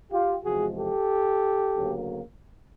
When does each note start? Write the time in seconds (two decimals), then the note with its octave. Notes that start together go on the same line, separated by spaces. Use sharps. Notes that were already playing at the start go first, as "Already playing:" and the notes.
0.11 F4 G4
0.45 E2 C3 F3 G#3 F#4 G#4
0.77 G4 A4
1.75 D2 C#3 F#3 A#3